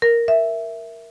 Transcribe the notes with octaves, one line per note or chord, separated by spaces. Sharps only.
A#4
E5